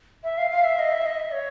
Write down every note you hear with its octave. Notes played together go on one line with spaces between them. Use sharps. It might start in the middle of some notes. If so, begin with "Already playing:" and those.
E5
F5
F5
E5
D#5
E5
D#5
E5
C#5